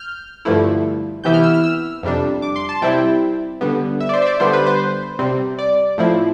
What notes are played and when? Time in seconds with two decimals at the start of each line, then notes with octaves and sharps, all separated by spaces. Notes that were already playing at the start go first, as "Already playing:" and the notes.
Already playing: F6 G6
0.45 G2 D3 F3 A3 E4
1.24 C3 E3 B3 E4 G6
1.34 F6
1.44 E6
1.54 F6
1.64 E6
2.03 F2 C3 G3 D4
2.42 D6
2.56 C6
2.69 A5
2.82 C3 G3 C4 E4 G5
3.61 D3 G3 B3
4.00 E5
4.09 D5
4.13 C5
4.22 E5
4.26 D5
4.40 D3 G3 B3 D4 C5
4.53 B4
4.66 C5
5.19 C3 G3 C4
5.59 D5
5.98 A2 F3 C4 E4